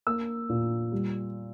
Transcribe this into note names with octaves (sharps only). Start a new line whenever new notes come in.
A#3 E6
A#2
G3